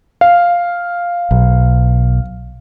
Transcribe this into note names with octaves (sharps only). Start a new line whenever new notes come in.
F5
B1